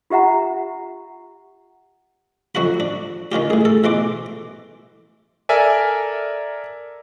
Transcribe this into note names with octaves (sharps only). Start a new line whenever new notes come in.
F4 G4 E5 F#5 A#5
F2 F#3 F#4 F#5 B5
D4
D#3 C#4 F4 G4
A2 G#4
A4
B2 E3 C6 D6
A4 A#4 D5 E5 G#5